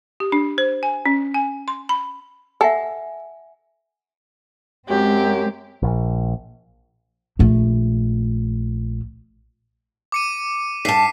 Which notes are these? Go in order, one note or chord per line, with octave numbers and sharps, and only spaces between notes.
G4
D4
C5
G#5
C#4
G#5
C6
B5
A4 E5 F#5 G#5
F#2 G#3 C4 G4
A#1
A#1 A3
D6 C#7 D#7
G2 A5 B6 C7